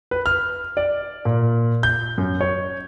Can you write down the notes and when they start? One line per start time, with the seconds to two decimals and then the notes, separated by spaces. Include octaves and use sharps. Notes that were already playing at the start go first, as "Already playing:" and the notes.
0.11 B4
0.26 F6
0.77 D5
1.25 A#2
1.83 G6
2.18 F#2
2.41 C#5